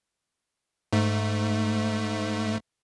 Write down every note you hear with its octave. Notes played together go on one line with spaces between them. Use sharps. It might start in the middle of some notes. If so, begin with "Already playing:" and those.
G#2 A3